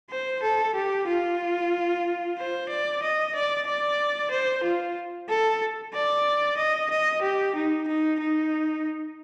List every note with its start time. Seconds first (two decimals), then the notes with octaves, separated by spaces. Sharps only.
0.11 C5
0.43 A4
0.75 G4
1.08 F4
2.37 C5
2.69 D5
3.02 D#5
3.35 D5
3.67 D5
4.31 C5
4.64 F4
5.29 A4
5.94 D5
6.57 D#5
6.90 D#5
7.22 G4
7.55 D#4
7.87 D#4
8.19 D#4